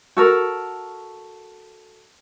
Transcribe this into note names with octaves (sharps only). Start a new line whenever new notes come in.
F#4 A4 A#4